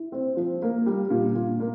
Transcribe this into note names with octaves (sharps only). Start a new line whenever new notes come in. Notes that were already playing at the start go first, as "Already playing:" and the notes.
Already playing: E4
C4
F3
A#3
G3
A#2
A#2
A#3